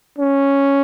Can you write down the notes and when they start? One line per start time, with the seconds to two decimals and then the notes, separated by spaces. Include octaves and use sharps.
0.18 C#4